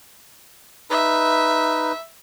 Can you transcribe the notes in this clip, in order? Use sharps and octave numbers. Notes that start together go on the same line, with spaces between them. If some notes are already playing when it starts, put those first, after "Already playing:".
D#4 B4 E5